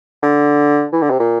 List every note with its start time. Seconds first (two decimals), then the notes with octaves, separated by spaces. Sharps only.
0.23 D3
0.93 E3
1.02 D3
1.10 C3
1.19 A#2